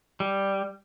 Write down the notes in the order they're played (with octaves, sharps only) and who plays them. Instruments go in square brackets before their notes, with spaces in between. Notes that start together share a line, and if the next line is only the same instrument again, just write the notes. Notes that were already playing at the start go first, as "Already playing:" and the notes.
[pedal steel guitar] G3